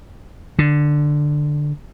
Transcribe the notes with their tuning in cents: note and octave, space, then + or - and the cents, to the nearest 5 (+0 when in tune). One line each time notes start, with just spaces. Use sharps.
D3 +10